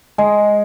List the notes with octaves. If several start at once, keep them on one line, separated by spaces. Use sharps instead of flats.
G#3